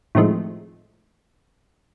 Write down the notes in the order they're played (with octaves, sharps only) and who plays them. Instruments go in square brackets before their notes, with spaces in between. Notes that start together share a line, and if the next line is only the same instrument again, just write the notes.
[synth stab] A2 C3 D#3 F3 G#3 A3